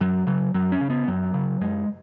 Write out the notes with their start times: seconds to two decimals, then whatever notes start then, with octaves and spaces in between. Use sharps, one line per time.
0.01 F#2 F#3
0.27 C#3 F#3
0.54 F#2 F#3
0.72 C#4
0.81 C#3
0.90 B3
1.08 F#2 F#3
1.34 C#3
1.61 F#2 G#3